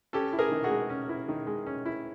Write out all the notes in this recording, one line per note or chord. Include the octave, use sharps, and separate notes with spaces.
C#4 G4 A4
E4
G#4 A#4
D#3
F#4 G#4
G#3
C#4
E4
D#3
G#3
C#4
E4